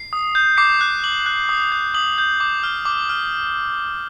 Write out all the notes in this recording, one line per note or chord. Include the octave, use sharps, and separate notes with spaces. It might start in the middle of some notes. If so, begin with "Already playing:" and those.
Already playing: C7
D#6
G6
D6 C7
F#6
D6 F#7
F#6
D#6
G6
D#6 F#7
G6
D6
F6
D6
F6